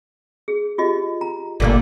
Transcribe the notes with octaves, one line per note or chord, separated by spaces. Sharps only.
G#4
F4 G4 D#5
A#5
G1 A#2 D3 A#3